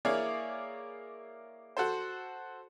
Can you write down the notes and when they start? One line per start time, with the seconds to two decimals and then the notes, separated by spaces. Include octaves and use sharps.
0.05 A#3 E4 G#4 C#5 D5 F5
1.77 F#4 A4 C5